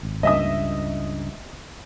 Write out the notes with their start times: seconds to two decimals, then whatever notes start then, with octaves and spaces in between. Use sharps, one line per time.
0.03 G#1
0.23 C#2 G2 D#5 E5 D#6